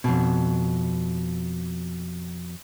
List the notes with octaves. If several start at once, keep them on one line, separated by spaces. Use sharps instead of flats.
F2 B2